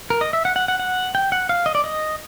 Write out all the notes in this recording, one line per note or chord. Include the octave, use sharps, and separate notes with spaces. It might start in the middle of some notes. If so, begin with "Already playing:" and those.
A#4
D#5
E5
F#5
F#5
F#5
F#5
G5
F#5
F5
D#5
D5
D#5